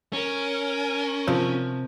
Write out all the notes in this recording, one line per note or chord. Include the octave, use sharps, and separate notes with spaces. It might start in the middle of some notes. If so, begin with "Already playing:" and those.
C#4 A#4
C3 F3